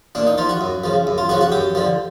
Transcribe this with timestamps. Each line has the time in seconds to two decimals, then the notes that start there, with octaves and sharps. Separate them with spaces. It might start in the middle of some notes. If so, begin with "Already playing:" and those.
0.15 A#2 D4
0.27 D#4
0.38 F3 F4
0.49 F#4
0.61 F#2
0.84 C#3 F3
1.07 F#2
1.18 F4
1.29 C#3 F3 F#4
1.41 F#4
1.52 F#2 G4
1.75 D3 F3